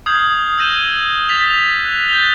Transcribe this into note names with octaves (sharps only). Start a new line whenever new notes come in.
D#6 F6 G6 G#6 C7 F#7
E6 G6 A#6 D#7 E7 G7
A6 B6 F7
F#6
G6 A6 A#6 F7 G7